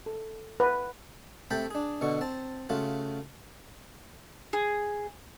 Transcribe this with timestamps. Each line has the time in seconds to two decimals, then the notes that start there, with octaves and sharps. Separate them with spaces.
0.06 A4
0.60 B4
1.50 C3 A3 G5 A5 B5
1.70 D4 G#4
2.01 B2 D3 C#6
2.21 C4 A5
2.69 C#3 A3 F4 F#4
4.53 G#4